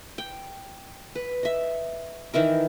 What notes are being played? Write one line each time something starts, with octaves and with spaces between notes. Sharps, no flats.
G5
B4
D#5 E5
D#3 E3 E4 A#4